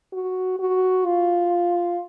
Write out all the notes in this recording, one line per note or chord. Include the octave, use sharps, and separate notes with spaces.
F#4
F#4
F4